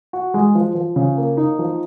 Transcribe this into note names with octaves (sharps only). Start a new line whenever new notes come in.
F#4
G#3
F3
F3
C#3
A#3
D#4
F3